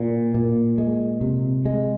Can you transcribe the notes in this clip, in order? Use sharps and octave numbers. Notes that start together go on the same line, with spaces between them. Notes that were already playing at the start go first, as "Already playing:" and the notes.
Already playing: A#2
A#2
G#3
C3
G#3